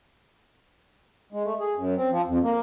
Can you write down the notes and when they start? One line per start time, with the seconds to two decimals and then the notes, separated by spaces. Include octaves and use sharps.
1.33 G#3
1.44 A3
1.60 G#4
1.77 F#2
1.96 C4
2.11 F3
2.27 F2
2.44 A#3